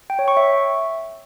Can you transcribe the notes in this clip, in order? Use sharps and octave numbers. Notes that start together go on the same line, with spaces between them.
G5
C#5
C#6
E5